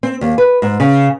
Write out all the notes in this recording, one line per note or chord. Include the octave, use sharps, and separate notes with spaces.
C4
D#2
B4
G#2
C#3